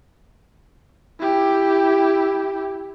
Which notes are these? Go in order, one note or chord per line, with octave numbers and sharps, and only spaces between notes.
E4 G4